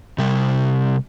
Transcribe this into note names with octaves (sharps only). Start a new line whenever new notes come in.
C3 G3